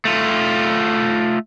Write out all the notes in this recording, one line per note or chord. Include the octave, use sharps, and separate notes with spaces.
A3 F4